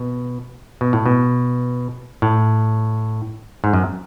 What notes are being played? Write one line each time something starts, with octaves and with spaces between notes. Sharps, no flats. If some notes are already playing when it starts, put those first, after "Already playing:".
Already playing: B2
B2
A2
B2
A2
G#2
F#2